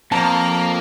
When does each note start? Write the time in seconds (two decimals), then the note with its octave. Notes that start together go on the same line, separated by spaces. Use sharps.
0.12 F2 A#3 A5 A#5